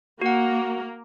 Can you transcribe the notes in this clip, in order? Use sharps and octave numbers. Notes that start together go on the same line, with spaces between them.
A#3 F#4 F#5